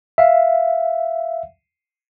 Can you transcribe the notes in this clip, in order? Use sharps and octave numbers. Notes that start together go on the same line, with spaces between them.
E5 F5